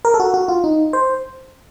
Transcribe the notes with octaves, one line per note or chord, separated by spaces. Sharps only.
A#4
A4
F#4
F#4
F4
D#4
C5